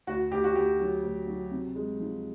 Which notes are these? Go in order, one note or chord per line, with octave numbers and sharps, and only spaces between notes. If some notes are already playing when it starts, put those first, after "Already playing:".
D2 F#4
D2 G4
F#4
D2 G4
F#3
D2
F#3
C3
G#3
F3